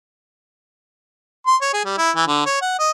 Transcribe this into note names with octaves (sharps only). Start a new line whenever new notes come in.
C6
C#5
G#4
G3
E4
E3
D3
C#5
F#5
D#5